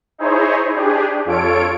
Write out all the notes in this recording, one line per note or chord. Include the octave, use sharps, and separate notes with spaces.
D#4 E4 G#4 C5 C#5
D4 G4 G#4
F2 F4 A4 C#5 D7